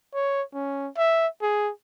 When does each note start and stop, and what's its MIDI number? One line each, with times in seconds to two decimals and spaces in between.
0.14 0.42 73
0.54 0.88 61
0.97 1.27 76
1.42 1.71 68